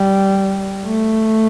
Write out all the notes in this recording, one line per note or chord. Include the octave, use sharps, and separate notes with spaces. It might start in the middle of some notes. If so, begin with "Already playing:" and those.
Already playing: G3
A3